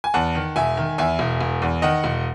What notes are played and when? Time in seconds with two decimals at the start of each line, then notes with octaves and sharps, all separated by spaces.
0.04 G#5
0.14 E2 F#5 A5
0.35 D#3
0.56 E1 E5 G#5
0.77 D#3
0.98 E2 E5 G#5
1.19 E1
1.41 E1
1.62 E2
1.82 D#3 D#5 F#5
2.04 E1